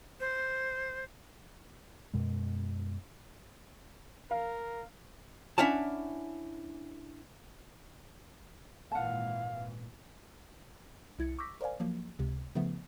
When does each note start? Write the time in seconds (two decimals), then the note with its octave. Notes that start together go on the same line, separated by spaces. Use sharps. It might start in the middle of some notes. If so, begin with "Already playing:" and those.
0.20 C5
2.13 F#2 B2 G#3
4.31 A#4 F5
5.58 C#4 D4 E4 F5 F#5 A5
8.92 G#1 A#2 E3 F5 F#5 A5
11.19 C2 E4 G#6 A6 C#7
11.39 C#6 D6 E6 G6 A#6 B6
11.61 A#4 C5 D5 F5 G#5
11.80 F3 F#3 A#3
12.19 C#2 C3
12.55 C#3 F3 A3 B3